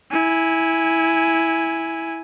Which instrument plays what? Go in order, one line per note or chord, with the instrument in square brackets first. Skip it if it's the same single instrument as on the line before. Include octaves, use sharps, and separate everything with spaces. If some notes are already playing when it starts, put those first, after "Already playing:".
[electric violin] E4 G#5